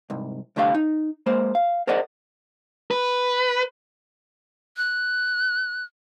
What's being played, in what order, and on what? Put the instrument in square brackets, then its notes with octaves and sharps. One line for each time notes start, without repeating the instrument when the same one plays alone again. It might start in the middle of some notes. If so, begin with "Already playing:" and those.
[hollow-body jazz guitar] C2 G#2
C2 D3 A3 G4 F5
D#4
G#3 A#3 C5
F5
G#4 A#4 C5 D5 D#5 F#5
[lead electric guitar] B4
[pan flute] F#6